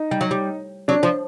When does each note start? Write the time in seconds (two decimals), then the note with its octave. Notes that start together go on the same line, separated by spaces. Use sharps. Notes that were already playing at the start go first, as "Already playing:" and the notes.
Already playing: D#4
0.11 G3
0.21 F#3
0.31 G3
0.88 F#3 D4
1.03 F3